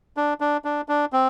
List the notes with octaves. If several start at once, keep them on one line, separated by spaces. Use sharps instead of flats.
D4
D4
D4
D4
C4